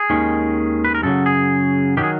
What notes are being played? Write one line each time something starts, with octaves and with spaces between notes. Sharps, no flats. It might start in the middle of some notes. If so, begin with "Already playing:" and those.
Already playing: G#4
D#2 D#3 G#3 C#4
B4
A#4
F#2 C#3 F#3 A4
G#4
D#3 F#3 G4
G#4